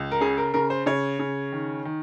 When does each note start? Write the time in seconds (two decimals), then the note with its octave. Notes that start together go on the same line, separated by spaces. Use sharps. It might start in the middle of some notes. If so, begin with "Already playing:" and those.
Already playing: C#2
0.12 A#4
0.21 C#3 G#4
0.38 A#4
0.54 C#3 A#4
0.70 C5
0.86 C#3 C#5
1.19 C#3
1.52 D#3
1.85 D#3